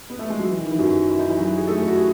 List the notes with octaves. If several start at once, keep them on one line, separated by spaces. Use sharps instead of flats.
B3
A3
G#3
F#3
E3
D#3
E3
F#2 F#3
E4
D#4
E3 E4
F#3 F#4
G#4
A3 A4
F#4
G#4